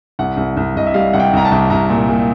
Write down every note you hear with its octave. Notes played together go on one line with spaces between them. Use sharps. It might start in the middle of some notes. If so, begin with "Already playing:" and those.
C2 F#5
C2
C2
C2 D#5
E5
G3 F5
C2 F#5
G5
C2 A#5
A5
C2
C2 A#5
A#2
A#2